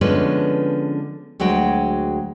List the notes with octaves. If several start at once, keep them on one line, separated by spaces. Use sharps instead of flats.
D3 F3 G#3 B3 C#4 B4
D2 F#3 G#3 F#4 G5